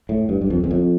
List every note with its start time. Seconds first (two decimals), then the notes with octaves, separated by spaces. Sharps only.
0.09 A2
0.29 G2
0.41 G2
0.50 F2
0.64 E2
0.71 F2